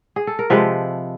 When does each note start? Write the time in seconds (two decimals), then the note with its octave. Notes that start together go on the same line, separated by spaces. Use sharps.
0.16 G#4
0.27 A4
0.39 A#4
0.50 C3 F3 G#3 A4 B4